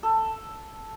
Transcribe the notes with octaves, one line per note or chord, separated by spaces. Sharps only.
A4